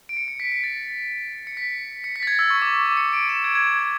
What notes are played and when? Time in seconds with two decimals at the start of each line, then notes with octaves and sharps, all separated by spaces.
0.09 D7
0.17 C#7
0.28 C#7
0.40 B6
0.52 B6
0.64 A6
1.47 C#7
1.57 B6
2.04 C#7
2.16 B6
2.23 A6
2.27 G#6
2.39 E6
2.50 C#6
2.62 D6
2.74 C#6
2.86 D6
2.97 C#7
3.13 D7
3.29 E7
3.44 G#6
3.55 G#6
3.67 G#6
3.79 G#6